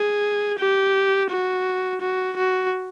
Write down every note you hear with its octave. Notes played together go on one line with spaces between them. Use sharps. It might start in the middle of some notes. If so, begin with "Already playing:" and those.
Already playing: G#4
G4
F#4
F#4
F#4